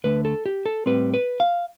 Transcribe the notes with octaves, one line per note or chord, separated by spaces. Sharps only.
D2 D3 A3 B4
A4
G4
A4
A2 G3 C4 B4
B4
F5